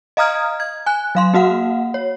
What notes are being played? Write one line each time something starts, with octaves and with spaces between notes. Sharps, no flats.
D#5 F5 A#5 D#6 F6 G#6
G#6
G#5 F#6
F#3 F5 C6
A#3 F#4 F5 F#5
C#5